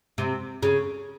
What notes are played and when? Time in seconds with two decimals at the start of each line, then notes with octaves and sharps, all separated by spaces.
0.18 C3
0.63 C#3